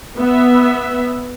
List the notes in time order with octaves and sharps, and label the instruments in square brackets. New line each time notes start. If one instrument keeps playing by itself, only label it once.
[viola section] B3 E5